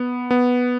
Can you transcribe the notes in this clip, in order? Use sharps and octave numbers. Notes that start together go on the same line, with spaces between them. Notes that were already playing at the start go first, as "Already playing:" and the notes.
Already playing: B3
B3